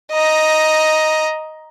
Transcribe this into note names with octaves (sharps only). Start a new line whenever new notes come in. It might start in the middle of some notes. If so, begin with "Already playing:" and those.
D#5 A#5